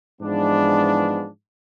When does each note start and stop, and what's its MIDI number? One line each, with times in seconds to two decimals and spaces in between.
0.20 1.27 44
0.20 1.27 52
0.20 1.27 53
0.20 1.27 56
0.20 1.27 59
0.20 1.27 62